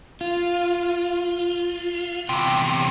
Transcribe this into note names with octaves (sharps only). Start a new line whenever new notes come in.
F4
E2 C3 G5